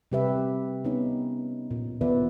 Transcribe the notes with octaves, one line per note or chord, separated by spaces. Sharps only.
C3 G3 G4 B4 E5
B3 C#4 D#4
A#2
D#3 B3 F4 B4 D5 E5